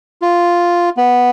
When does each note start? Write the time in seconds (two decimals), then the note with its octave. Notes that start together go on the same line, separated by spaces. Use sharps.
0.22 F4
0.97 B3